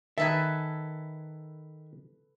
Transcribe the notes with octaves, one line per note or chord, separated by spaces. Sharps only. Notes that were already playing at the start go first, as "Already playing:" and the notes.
D#3 D#4 A4 B4 E5 G#5